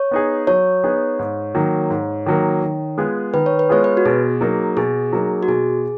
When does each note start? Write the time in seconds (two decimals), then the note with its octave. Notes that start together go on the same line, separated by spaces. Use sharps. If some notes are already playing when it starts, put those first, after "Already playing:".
Already playing: C#5
0.11 B3 D#4 G#4
0.47 F#3 C#5
0.84 B3 D#4 G#4
1.19 G#2
1.55 D#3 F#3 A#3
1.90 G#2
2.26 D#3 F#3 A#3
2.62 D#3
2.98 G#3 B3 F4 G#4
3.34 D#3 B4
3.46 C#5
3.59 B4
3.69 G#3 B3 F4 G#4 C#5
3.84 B4
3.97 F#4
4.05 B2 G#4
4.41 F#3 A#3 D#4
4.77 B2 G#4
5.12 F#3 A#3 D#4
5.43 F#4
5.48 B2 G#4